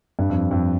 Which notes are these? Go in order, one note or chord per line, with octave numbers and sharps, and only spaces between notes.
G2
F2
F2